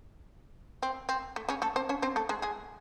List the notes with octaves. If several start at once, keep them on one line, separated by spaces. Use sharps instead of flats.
C4
C4
A3
C#3 C#4
A3 A4
C4 C5
C#4 C#5
C4 C5
A3 A4
G#3 G#4
G#3 G#4